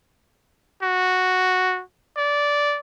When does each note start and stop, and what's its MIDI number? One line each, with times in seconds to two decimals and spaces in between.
0.83 1.82 66
2.17 2.80 74